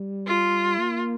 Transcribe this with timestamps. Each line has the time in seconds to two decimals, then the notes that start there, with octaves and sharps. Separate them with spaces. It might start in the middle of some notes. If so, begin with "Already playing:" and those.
Already playing: G3
0.27 F4
0.79 A#3